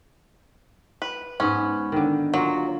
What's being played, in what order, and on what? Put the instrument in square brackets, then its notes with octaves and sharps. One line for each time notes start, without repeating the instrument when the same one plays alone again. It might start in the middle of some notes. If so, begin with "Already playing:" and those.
[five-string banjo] B4
[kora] G#2 B3 B4 [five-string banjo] C#4
[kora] D3 D#3
[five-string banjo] F#3 [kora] A#3 F4